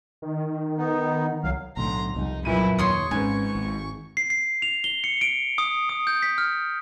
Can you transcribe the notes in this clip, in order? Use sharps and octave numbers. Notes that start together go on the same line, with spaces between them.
D#3
B3 D#4
C2 F#3 F5
B1 A2 D3 A#5 C6
C2 F2 G3 D#4
F#2 A#2 E4 B4 D#7
D#2 C#5 C6 C#6 D#6
G#1 G#2 C#4 B4 G#5
G#1
C7
C7
F7
G7
C#7
D7
D#6
D#6
G6
B6
F6